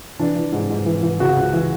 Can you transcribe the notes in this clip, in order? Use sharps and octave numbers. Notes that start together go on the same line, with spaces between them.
E3 D4
E3
G#2
G#2
E3
E3
C#3 F#4
C#2
E3